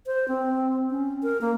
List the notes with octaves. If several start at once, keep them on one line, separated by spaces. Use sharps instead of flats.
C5
C4
C#4
A#4
A#3